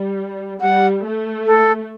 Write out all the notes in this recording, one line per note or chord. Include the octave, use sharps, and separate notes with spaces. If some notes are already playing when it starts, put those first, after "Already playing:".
Already playing: G3
G3 F#5
A3
A4